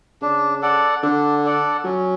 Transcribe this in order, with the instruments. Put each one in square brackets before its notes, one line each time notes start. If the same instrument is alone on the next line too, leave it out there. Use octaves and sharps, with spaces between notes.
[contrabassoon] C#3 [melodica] D4
[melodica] A4 D5 F#5
[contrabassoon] D3 [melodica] D4
[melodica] A4 D5 F#5
[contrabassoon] F#3 [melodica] C#4